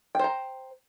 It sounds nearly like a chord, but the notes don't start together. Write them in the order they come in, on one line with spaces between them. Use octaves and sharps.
G5 C5 A#5